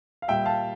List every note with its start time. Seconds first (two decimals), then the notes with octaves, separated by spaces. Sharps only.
0.22 F5
0.28 A#2 G3 E5 G5
0.45 F5 A5